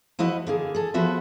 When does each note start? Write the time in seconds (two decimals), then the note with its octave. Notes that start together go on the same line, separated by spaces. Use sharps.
0.19 F3 E4 F#4 B4 D#5
0.47 D3 A#3 G#4
0.75 G#4 A4
0.94 F3 B3 F4 F#4 B4 E5